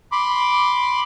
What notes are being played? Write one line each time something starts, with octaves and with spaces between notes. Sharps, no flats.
B5 C6 D6